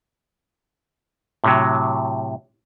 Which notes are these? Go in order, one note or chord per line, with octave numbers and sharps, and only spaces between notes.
A2 C3 F#3